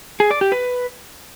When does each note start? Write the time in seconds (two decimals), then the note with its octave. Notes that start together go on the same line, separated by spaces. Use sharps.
0.20 G#4
0.31 D5
0.41 G4
0.52 B4